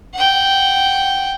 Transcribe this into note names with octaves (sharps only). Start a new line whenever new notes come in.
F#5 G5